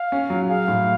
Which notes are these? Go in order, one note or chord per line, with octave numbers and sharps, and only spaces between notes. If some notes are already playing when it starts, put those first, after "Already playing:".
Already playing: F5
C#4
F#3
G#4 F5
A2